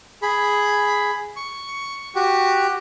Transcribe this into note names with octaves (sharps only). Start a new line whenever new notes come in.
G#4 B5
C#6
F#4 G4